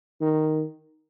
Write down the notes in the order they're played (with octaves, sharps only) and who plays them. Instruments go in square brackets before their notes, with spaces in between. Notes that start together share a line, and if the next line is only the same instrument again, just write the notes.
[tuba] D#3